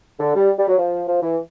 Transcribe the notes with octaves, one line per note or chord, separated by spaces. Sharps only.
D3
G3
G3
F#3
F3
F3
E3